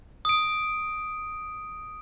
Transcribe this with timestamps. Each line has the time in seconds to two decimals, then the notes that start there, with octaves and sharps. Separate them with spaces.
0.25 D#6 D7